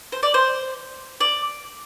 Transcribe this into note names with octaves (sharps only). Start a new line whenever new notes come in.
C5
D5
C5
D5